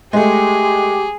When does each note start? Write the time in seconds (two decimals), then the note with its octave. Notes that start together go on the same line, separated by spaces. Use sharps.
0.13 G#3 A3 G4 G#4